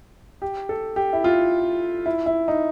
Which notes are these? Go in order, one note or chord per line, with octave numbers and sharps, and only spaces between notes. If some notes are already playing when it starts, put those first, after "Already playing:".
G4
A4
G4
E4
F4
E4
E4
D#4